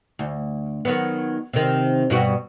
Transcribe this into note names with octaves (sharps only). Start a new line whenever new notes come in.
D2
D#3 F#3 B3
C3 D#3
G2 B2 F#4